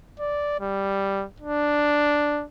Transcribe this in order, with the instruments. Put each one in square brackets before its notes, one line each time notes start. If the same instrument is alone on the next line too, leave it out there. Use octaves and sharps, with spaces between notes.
[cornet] D5
G3
D4